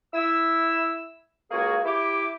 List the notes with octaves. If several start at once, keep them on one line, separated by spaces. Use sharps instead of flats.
E4 E6
C#2 A#3 F#4 G#4 G#5 C#6
E4 G4 D6